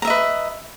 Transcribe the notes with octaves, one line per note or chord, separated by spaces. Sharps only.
B4 D#5 E5 A#5